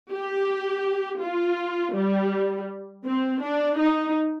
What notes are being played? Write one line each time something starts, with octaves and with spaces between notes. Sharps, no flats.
G4
F4
G3
C4
D4
D#4